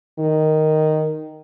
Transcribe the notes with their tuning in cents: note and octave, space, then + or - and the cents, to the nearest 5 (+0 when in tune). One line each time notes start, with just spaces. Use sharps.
D#3 -5